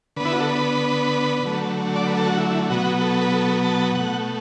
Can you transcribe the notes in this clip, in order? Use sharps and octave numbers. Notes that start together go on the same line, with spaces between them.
D3 B3 B4
E4
F#4
A4
B4
D3 F#3 A3
D5
B4
A4
F#4
E4
B2 F#3 B3 F#4
A4
B4
A4
A5
B2 A3 F#5